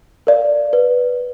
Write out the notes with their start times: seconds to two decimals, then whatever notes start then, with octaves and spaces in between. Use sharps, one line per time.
0.27 A#4 D5 F5
0.73 B4